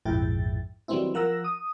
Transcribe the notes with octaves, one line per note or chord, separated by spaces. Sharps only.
A#1 F2 G#2 E4 G5 A6
D#3 F#3 G3 B3 C4 E4
F3 A#4 F#5 E6 A#6
D#6